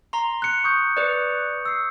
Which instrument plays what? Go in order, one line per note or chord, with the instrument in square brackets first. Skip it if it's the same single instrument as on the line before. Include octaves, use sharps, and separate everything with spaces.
[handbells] A#5 C6
[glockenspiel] F#6 C#7
C#6 D#6 G6
[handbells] B4 D5
[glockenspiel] E6 C7